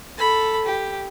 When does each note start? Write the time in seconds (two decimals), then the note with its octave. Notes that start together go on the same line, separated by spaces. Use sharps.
0.18 A4 B5
0.66 G4